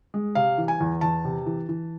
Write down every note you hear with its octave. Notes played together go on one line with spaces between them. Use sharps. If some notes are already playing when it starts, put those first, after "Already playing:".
G#3
C3 F5
E3
G#5
E2
E2 A5
C3
E3
E3